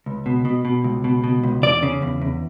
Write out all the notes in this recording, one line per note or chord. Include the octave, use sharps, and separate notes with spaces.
C#2
B2
B2
B2
C#2
B2
B2
C#2
E2 D5
C#3
E2
E2